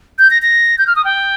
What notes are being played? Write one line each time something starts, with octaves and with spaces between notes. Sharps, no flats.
G6
A#6
A#6
G6
F6
D#6
G5